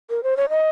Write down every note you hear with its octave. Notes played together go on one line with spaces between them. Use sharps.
A#4
C5
C#5
D#5